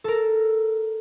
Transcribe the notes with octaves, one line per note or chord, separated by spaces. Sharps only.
A4 A#4